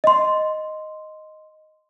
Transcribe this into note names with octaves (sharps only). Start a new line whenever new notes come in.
D#5 C6